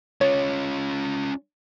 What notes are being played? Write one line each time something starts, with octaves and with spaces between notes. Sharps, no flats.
C#4 F4 C#5